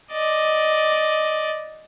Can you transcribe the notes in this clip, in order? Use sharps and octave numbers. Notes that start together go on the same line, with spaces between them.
D5 D#5